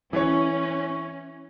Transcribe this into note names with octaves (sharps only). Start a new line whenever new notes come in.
E3 C#4 C#5